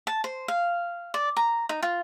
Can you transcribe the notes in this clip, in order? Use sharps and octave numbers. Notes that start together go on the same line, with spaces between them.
A5
C5
F5
D5
A#5
D#4
F4